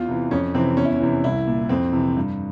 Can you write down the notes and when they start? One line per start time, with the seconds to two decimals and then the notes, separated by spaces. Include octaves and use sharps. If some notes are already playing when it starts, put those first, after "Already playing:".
Already playing: E2 F4
0.08 C3 E3
0.31 F2 C#4
0.54 C3 E3 C4
0.77 E2 C#4
0.85 E4
0.93 C#4
1.00 C3 E3
1.24 C2 E4
1.47 A#2
1.69 F2 C4
1.92 C3 E3
2.17 G2